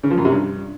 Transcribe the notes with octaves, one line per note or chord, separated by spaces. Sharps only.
C#3
F3
F#2
C3
G2